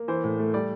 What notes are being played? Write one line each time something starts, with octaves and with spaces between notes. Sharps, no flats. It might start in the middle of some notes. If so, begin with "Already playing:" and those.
Already playing: A#3
E3 C5
A2
A3
G3 D5